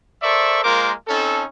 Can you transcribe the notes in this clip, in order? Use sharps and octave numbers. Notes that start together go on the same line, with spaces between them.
A4 A#4 C5 D5 E5 C#6
G#3 A#3 F4 A#4 C5 D6
C4 C#4 D#4 A4